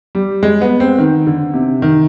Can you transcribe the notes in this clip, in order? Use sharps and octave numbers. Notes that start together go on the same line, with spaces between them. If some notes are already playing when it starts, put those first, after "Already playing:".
G3
G#3
B3
C4
D#3
D3
C3
D#3